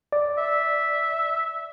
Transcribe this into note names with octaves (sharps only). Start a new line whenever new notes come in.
D5
E5